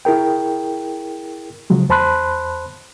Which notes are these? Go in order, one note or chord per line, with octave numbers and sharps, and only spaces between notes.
E4 G#4 A#4 G5
C#3 F3 F#3 G#3
E2 C5 A5 B5 C6 F#6